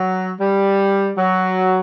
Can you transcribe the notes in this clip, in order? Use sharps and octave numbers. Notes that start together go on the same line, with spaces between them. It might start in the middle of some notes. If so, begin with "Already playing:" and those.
Already playing: F#3
G3
F#3